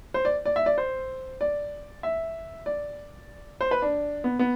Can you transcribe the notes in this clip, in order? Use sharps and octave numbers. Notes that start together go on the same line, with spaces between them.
C5
D5
D5
E5
D5
C5
D5
E5
D5
C5
B4
D4
B3
B3